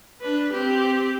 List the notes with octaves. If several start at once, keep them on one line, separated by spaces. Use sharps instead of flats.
D4 B4
C4 G4